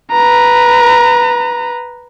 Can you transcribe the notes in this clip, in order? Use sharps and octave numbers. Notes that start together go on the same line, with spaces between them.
B4 A#5